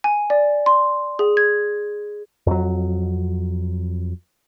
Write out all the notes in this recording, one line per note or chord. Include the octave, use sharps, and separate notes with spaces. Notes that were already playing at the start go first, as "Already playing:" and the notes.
G#5
D5
C6
G#4
G#6
F2 F#3